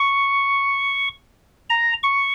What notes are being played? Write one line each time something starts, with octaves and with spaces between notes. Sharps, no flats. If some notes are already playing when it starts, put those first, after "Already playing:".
Already playing: C#6
A#5
C#6